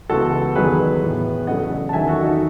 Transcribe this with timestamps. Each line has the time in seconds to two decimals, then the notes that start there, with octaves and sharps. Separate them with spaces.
0.10 C#2 C#3 E3 B3 F#4 A4
0.55 E2 D#3 F#3 B3 G#4 B4
1.02 A2 E3 B3
1.47 E2 C#3 F#3 A3 D#5 F#5
1.89 A5
1.92 E2 D#3 F#3 E5 G#5
2.08 F#4 A4
2.23 D#4 F#4